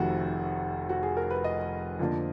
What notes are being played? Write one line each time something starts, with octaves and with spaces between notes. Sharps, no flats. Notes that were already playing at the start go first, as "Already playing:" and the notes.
Already playing: F1 F2 D#3 F#4
F#4
G#4
A#4
B4
D#5
F2 D3 F3 A#3 D4